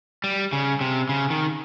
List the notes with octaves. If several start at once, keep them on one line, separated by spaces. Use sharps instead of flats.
G3
C#3
C3
C#3
D#3